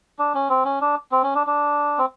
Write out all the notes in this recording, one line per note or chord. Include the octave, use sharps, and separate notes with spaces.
D4
C#4
C4
C#4
D4
C4
C#4
D4
D4
C4